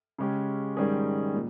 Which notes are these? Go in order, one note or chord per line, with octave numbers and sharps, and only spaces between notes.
C#3 G#3 C#4 G4
G#2 D#3 G3 C#4 G#4
A#2